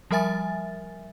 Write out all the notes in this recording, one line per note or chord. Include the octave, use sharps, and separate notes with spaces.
F3 G3 A#4 E5 G#5 A6